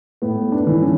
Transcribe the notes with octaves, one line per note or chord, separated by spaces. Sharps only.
A2 B3
D4
E3
C#4